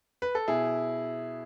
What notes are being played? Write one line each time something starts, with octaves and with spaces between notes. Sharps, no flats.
B4
A4
B2 E4 G#4